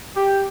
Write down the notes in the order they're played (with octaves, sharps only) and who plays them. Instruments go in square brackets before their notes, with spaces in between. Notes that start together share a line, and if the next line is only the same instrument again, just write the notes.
[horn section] G4